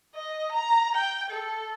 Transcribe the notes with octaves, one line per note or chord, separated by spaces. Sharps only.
D#5
A#5
G5
A4